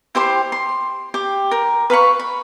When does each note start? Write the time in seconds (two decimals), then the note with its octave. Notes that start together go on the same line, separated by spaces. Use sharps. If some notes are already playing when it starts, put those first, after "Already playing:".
0.15 E4 G4 C5 C6
0.52 C6
1.14 G4
1.51 A#4
1.90 B4 F5 B5 C#6
2.19 B5